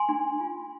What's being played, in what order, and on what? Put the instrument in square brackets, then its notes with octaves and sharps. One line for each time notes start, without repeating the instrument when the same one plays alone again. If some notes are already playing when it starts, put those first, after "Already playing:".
Already playing: [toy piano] G#5 C6
D4
F4